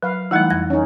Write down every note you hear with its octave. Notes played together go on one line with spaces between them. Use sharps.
F#3 B4 F5
E3 G3 A3 D#4 E4 F#5
F2 A#6
C#4 D#4